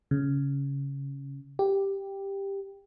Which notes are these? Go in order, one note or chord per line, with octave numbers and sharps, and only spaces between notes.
C#3
G4